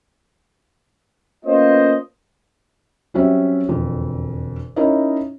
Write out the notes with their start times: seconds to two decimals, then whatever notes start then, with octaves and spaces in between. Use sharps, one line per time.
1.45 A#3 B3 C#4 F4 C5 D#5
3.14 F#3 G3 C4 C#4 F#4 E5
3.69 E1 F2 D3 F4
4.76 C#4 D#4 E4 A#4 C#5 D#5